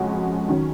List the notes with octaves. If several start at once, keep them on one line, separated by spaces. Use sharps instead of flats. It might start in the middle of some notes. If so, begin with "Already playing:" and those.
Already playing: F2 C#3 G#3 C#4 F#4
D#3 F#3 C#4